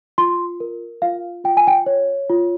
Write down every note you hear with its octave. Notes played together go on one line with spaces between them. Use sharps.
F4 C6
A#4
F4 F5
F4 G5
G#5
G5
C#5
F4